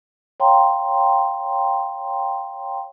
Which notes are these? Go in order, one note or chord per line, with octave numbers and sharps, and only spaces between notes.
C#5 F5 G5 A#5 C6